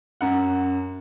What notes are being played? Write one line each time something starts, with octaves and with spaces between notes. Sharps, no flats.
F#2 F#5